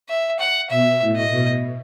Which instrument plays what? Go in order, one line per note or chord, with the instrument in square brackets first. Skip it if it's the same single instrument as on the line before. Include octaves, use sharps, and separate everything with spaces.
[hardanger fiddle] E5
F#5
[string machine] B2 [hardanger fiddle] E5
[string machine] A2
[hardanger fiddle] D#5
[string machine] B2